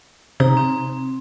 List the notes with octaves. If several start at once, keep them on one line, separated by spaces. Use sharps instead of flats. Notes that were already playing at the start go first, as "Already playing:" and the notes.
C3 D#4 A#5
C4